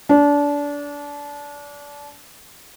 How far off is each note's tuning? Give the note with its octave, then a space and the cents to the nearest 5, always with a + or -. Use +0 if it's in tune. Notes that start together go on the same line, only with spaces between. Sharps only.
D4 -25